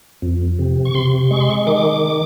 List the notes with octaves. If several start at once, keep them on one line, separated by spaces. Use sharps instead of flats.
F2
C3
C#6
C3 C6
G#3 C#6
C6
C#6
D#3 D6